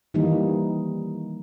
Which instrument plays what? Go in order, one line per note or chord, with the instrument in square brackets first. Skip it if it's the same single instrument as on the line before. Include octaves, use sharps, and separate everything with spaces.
[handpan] D#3 E3 G3 A#3 D#4